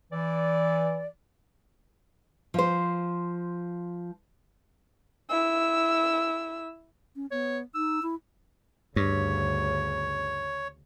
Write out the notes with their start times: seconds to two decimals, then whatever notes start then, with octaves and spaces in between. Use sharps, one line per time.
0.12 E3 D5
2.54 F3 C5
5.30 E4 E6
7.16 C#4
7.31 B3 C#5
7.75 D#4 E6
8.03 E4
8.96 D2 G2 C#3 C#5